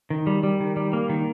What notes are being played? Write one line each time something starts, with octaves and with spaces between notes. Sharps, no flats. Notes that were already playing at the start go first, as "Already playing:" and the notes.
D#3
G3
G3
D#3
G3
A#3
D#3